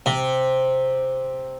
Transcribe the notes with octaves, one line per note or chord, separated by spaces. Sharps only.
C3